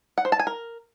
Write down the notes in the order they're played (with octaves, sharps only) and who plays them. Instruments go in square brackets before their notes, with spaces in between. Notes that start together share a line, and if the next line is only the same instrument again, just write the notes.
[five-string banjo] F#5
C5
A5
G#5
A#4